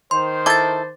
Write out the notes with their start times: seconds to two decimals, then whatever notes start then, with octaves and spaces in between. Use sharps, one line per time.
0.11 D#3 C5 C6
0.46 E4 A4 D6 A6